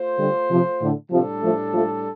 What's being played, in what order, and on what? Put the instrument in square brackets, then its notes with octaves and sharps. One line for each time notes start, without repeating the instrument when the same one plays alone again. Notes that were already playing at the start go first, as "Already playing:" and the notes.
Already playing: [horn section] A3 F4 C5
[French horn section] D3 G3
C3 F3
A2 D3
[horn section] A2 G3 D4 A4 [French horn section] C3 F3
[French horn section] F3 A3
F3 A3